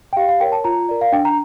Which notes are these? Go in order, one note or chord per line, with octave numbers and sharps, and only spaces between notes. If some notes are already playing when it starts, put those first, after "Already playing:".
G5
G4 F5
F5
A#4 C#5 G5
A5
F4 A#5
A#4 D5
F5
D4 G5
A#5